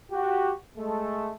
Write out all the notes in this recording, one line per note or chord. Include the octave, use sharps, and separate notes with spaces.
F#4 G4
G#3 A3